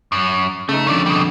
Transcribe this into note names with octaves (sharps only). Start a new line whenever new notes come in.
F#2
C#3 A3 D#4
F2 D3 C#4 D5
B2 G3